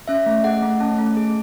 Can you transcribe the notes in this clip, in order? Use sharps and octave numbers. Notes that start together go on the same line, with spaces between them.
C#4 E5
A3
G#4 F#5
A3
C#4 A5
A3
G#4